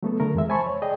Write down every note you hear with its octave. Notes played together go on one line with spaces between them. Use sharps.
F#3 A3 B3 A4
D3 A3 A#4
F2 E3 G#3 E5
C5 G#5 A5 B5 C#6
C#5
G#4 D5 D#5 G5